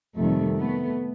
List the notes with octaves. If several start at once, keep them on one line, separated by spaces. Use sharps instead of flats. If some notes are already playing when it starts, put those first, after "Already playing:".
F2 C3 D#3 G3 A3
A3 B3